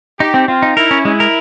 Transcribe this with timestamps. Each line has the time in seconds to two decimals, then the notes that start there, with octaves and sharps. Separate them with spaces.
0.20 D#4 G4
0.34 C4
0.48 C4 F4
0.62 D#4
0.77 E4 A#4
0.91 C#4
1.05 G#3 E4
1.20 A#4